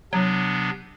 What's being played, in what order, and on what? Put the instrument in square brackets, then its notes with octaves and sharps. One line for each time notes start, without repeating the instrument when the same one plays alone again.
[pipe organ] C3 B3 D4 [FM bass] F#3